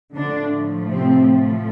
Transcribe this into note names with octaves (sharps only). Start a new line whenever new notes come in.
A2 D3 F3 A3 D4
C3 C4